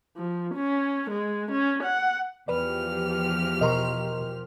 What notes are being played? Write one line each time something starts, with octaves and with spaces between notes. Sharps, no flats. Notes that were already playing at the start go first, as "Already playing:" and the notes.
F3
C#4
G#3
C#4
F#5
E2 F3 G4 B4 D5 F6
B2 A#4 D#5 A#5 C6 C#6